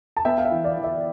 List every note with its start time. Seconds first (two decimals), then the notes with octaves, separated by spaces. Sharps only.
0.17 A5
0.25 B3 E5 G5
0.38 F5
0.45 E5
0.51 E3
0.64 D5 F5
0.77 E3
0.84 E5